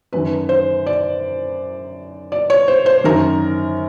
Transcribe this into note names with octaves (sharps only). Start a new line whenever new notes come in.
F#2 D#3 B4
C5
D5
D5
C#5
C5
C5
F#2 D#3 A#4